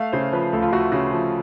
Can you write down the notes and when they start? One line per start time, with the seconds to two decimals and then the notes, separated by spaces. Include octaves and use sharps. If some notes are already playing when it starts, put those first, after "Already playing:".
Already playing: A3 F5
0.12 C#3 C5
0.32 F3 B4
0.53 D2 A4
0.62 F4
0.73 A3 F#4
0.92 C#3 F#4
1.11 F3